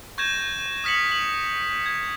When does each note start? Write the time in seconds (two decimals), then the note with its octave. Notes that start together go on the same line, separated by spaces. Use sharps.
0.18 C#6 G6 G#6 A#6 E7
0.84 D#6 F6 B6 C#7 F#7
1.12 F#7
1.86 G#6